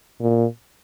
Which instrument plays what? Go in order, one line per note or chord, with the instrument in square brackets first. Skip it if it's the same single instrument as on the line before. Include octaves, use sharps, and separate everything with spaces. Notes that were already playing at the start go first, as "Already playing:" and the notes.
[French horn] A#2